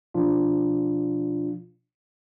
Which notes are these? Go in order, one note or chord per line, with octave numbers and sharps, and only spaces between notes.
B2 F3 D4 F4